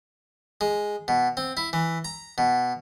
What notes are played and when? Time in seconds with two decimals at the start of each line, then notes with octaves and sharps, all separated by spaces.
0.61 G#3
1.08 B2
1.37 C4
1.57 E4
1.73 E3
2.05 A#5
2.38 B2